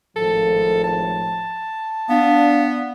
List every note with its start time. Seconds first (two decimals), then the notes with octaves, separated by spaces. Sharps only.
0.16 G#1 A2 F3 A4
0.84 A5
2.09 B3 D4 F5